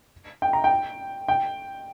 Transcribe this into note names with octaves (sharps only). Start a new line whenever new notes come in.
G5
A#5
G5
G5